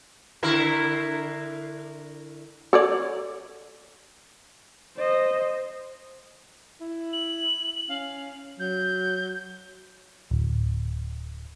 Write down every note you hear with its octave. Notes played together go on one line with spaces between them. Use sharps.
D3 E4 A#4
A4 C#5 D5
C5 D#5
E4
F#7
C#4 F5
F#3 G6
D1